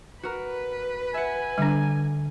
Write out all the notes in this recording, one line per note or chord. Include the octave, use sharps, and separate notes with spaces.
F#4 A#4 B4
E5 F#5 G#5
D3 G3 D4